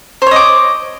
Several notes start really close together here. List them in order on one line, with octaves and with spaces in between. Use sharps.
C5 C#5 D#5 D6